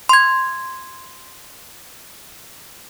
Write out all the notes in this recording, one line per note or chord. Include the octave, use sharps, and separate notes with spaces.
C6 G#6